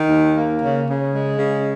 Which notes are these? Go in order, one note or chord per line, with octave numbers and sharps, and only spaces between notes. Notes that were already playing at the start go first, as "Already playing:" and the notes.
Already playing: D#3
D#2
A#3
C#3
C#3
G#3
C#3